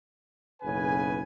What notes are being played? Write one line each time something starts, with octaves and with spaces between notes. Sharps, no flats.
F#1 B1 C#3 B4 G#5